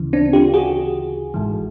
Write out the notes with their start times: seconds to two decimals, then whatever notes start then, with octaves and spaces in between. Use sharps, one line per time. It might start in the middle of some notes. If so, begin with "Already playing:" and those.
Already playing: D2 C#3 E3
0.13 C4 D4
0.33 F4 G4
0.54 F#4 G#4
1.34 G#1 G#2 E3